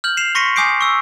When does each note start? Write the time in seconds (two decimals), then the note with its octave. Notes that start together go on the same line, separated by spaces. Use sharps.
0.04 F6 G6 F#7
0.17 C7 E7 F7
0.35 C6 C#6 A#6 B6 C#7 D#7
0.56 G#5 D6 D#6 G6 C7 D7
0.81 C#6 E6